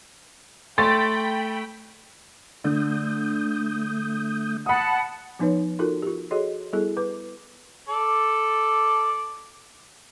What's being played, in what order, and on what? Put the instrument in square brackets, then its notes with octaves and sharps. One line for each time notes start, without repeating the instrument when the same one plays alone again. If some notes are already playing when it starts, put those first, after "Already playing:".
[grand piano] A3 [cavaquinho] C#5 C6 [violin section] G5 B5 [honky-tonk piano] A6
[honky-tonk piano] D3 [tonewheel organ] A3 D#6 G6
[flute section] F#5 A5 [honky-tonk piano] B5 D#6
[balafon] F3 B3 D#4 B4 C#5
D#4 F4 F#4 A4 A#4
F4 G4
F#4 G#4 A4 C#5 D#5 C6
G3 B3 E4 G#4 A4
B4 D6
[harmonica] A4 D5